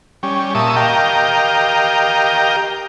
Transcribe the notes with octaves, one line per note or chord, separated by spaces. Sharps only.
G3 C#4
A#2 E5 A5 C#6 D#6
G4 A#4 D#5 F5 G5